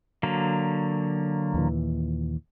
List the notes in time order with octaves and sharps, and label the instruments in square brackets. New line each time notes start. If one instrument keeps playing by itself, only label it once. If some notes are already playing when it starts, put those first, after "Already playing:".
[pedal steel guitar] D3 F#3 A#3
[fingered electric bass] D#2 A#2 E3